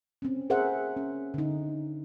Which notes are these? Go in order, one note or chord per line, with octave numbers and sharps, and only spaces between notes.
C4 C#4
G#4 A#4 C5 E5 F#5
C#4
D3 D#4